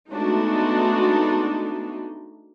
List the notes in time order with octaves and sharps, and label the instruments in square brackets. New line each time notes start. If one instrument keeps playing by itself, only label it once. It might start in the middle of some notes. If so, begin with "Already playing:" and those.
[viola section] G#3 A3 B3 D4 D#4 F#4